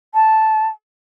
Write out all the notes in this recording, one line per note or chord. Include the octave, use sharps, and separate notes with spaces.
A5